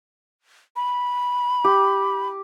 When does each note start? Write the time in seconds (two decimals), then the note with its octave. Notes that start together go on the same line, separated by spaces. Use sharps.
0.76 B5
1.64 G4